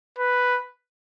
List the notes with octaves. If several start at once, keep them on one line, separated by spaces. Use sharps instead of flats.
B4